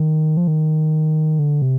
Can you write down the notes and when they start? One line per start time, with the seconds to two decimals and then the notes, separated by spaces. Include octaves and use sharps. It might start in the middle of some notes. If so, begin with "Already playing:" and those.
Already playing: D#3
0.37 F3
0.48 D#3
1.39 D3
1.62 C3